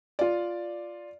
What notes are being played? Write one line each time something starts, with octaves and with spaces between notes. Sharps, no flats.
F4 D5